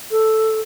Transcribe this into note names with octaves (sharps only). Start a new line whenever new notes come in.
A4